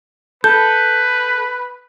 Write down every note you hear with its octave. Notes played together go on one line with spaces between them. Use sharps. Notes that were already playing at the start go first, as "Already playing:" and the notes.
A4 B4 G6